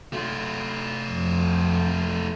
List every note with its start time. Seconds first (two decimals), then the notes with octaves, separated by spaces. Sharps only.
0.13 A3 F4
1.09 F2